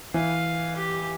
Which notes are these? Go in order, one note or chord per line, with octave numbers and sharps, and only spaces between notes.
E3 F5
G4